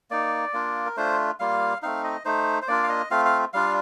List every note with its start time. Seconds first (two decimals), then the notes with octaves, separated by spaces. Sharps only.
0.11 A#3 D#4 D5
0.54 A#3 D4 F4
0.86 A#4
0.96 A3 D4 F4 C5
1.40 G3 A#3 F4 F5
1.82 A3 C4 D#4 F5
2.04 D#5
2.25 A3 D#4 C5
2.62 C5
2.68 A#3 D4 F4 D5
2.84 F5
2.90 D#5
3.11 A3 C4 F4 F5
3.25 F5
3.53 G3 D4 F4 F5